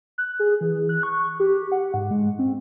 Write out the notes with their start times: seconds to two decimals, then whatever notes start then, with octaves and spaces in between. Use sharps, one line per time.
0.18 F#6
0.39 G#4
0.61 E3
0.89 F#6
1.03 C#6
1.40 G4
1.72 F#5
1.94 G#2
2.11 G#3
2.39 C4